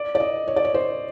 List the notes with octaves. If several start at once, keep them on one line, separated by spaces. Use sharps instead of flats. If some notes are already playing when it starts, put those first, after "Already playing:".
Already playing: D5
D5
D#5
C#5
D5
C#5
C5